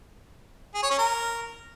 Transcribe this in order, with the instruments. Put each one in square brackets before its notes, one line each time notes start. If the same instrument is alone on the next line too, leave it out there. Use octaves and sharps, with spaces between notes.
[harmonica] G#4
C#5
C#4
A#4